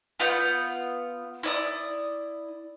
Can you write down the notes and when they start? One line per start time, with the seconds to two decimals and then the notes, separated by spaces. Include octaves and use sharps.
0.20 B3 F4 F#5 G6
1.43 E4 D5 D#6